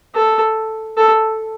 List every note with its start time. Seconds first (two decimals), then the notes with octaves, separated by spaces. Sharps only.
0.15 A4
0.97 A4